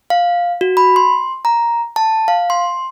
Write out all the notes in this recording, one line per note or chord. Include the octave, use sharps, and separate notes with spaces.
F5
F#4
B5
C6
A#5
A5
F5
C6